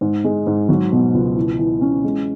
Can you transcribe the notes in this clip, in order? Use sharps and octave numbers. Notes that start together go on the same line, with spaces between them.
G#2
G#3
G#2
F#3
B2
C#2
E3
E3
C#4
G#3